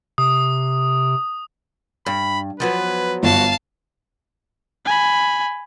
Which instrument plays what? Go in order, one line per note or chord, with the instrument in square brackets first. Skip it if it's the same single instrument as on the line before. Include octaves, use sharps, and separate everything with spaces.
[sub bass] C3 [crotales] D#6
[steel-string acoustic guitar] G2 [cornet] B5
[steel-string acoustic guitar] F3 F#3 B3 [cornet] B4
[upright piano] G1 [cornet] F#4 [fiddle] F5 A5
[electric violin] G#5 B5